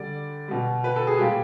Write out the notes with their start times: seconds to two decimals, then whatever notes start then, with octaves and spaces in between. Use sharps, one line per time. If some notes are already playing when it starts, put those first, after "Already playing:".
Already playing: D3 G3 D5
0.48 B2 G3
0.84 B4
0.96 A4
1.07 G#4
1.18 A#2 G3 G4